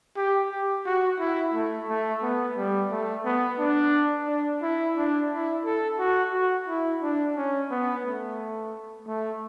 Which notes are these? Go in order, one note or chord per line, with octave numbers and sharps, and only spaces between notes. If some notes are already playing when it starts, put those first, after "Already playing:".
G4
G4
F#4
E4
A3
A3
B3
G3
A3
B3
D4
D4
E4
D4
E4
A4
F#4
F#4
E4
D4
C#4
B3
A3
A3